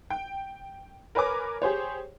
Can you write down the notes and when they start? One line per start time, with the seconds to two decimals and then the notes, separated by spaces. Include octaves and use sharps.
0.10 G5
1.15 A#4 B4 C#5 G#5 D6
1.62 G4 G#4 C5 C#5